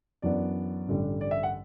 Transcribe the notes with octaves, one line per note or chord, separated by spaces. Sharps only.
F#2 E3 B3 D4 D5
A1 G2 D3 G3 D4
D5
E5
F#5